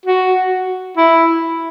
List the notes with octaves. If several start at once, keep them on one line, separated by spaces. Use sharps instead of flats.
F#4
E4